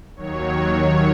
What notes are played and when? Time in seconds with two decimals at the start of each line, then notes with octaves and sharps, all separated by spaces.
0.16 D#2 D#3 F#3 C#5
0.53 C#5